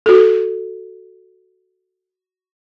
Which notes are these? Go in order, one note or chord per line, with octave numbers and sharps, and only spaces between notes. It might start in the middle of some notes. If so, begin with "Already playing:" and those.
F#4 A4